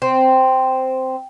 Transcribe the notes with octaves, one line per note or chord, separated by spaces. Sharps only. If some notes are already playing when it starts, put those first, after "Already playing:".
C4